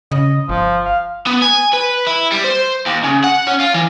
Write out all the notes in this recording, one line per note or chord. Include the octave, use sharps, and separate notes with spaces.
C#3 D#5
G1 F3
F5
B3
G#5
B4
E4
G3
C5
D#2
C#3
F#5
C#4
F4
E3